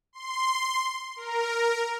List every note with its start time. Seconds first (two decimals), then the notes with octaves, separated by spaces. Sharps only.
0.13 C6
1.16 A#4